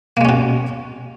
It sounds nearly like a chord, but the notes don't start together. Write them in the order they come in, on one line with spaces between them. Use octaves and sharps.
A#3 G#3 C#4 B2